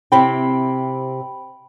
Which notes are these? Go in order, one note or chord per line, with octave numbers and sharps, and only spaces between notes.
C3 C4 E4 G5 B5